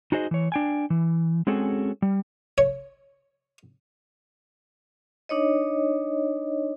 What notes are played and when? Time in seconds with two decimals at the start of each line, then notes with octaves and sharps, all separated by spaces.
0.12 D#4 F#4 G#4 C5 D#5
0.31 E3 C#5
0.52 D4 G5 G#5
0.90 E3
1.47 G#3 C4 C#4 F#4 G#4 A4
2.02 G3
2.58 C#5
5.29 D4 D#4 C#5 D#5